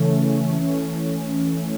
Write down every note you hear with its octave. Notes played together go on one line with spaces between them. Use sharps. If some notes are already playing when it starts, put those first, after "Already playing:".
Already playing: C#3 E3 A3 C#4
E3 A3 C#4